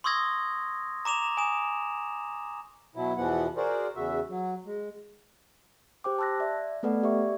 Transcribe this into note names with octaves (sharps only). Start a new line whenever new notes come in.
C6 C#6 D#6 E6 G#6 A#6
A#5 D6 E7 F7
G#5 D#6 E7
B2 F#3 E4
E2 B2 E3 F3 B3 F#5
F#4 G#4 A#4 C5 D5
E2 C#3 F#4 E5
F#3
G#3
G4 C5 G5 D6
A5 C6 E6 F#6 A#6
D5 E5
A3 B3 A4 B4 D5 F#5
G4 D5 E5 C#6